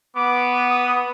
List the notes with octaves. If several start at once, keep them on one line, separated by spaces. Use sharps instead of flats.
B3 D6
D#6